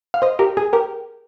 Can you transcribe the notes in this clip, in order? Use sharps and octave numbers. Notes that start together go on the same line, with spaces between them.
F5
C5 D#5
G4 A#4
G#4
G4 A#4